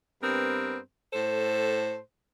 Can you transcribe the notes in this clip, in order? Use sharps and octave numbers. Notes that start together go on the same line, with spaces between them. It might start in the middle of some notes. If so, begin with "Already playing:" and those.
G2 B3 C4 A#4
A2 A4 C5